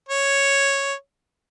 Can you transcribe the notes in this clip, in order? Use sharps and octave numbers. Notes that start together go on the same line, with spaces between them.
C#5